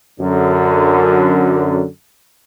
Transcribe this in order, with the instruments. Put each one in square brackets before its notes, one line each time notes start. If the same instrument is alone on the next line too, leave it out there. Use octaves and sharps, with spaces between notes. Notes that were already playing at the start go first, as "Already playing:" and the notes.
[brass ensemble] F#2 D3